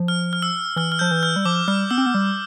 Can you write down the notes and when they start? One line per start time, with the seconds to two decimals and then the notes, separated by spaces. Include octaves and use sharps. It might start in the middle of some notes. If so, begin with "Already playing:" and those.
Already playing: F3
0.08 F6
0.33 F6
0.42 E6
0.76 E3 F6
0.92 F6
0.99 F3 G6
1.11 E3
1.23 F6
1.36 G3
1.45 F3 D6
1.68 G3 F6
1.91 B3 E6
1.98 C4
2.06 B3
2.14 G3